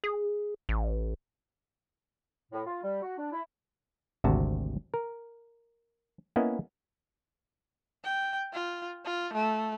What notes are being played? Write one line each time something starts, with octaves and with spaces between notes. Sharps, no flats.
G#4
A1
A2
F4
G3
F#4
D4
E4
G#1 D2 C3 F#4 A5
A#4
A#3 B3 C#4 E4 D#5
G5
F4
F4
A3